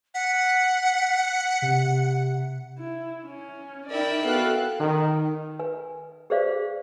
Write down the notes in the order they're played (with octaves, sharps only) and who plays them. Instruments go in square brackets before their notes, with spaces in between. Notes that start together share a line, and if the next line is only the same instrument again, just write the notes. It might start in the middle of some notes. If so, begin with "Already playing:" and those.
[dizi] F#5 [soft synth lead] B6
[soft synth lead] C3
[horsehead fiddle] E4
C#4
[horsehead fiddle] D#4 A#4 [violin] E4 G5 [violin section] D5
[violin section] B3 F5 F#6 [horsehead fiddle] F#4 A4
[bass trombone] D#3
[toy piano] B4 G#5
G4 G#4 B4 C5 D5 F5